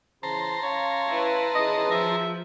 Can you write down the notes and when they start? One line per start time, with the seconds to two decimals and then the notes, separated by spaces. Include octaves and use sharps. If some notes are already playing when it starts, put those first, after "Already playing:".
0.23 C#3 E3 C5 A5 A#5 C6
0.63 C#4 C#5 F5
1.09 E4 B4
1.55 D#3 C#4 G#4 D#5
1.91 F3 E5